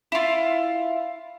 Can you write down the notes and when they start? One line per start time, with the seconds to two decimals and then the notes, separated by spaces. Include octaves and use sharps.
0.12 E4 F4